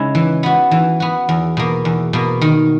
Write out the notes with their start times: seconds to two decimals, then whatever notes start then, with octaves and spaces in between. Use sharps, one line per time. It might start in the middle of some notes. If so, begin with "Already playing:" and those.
Already playing: C#3 G#3 C#4 E4
0.15 E3
0.43 B3 F#4
0.71 E3
1.00 B3 F#4
1.29 E2
1.57 B2 A#3
1.85 E2
2.13 B2 A#3
2.41 D#3